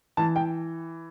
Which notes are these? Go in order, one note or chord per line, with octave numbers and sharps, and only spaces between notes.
E3 A5
G5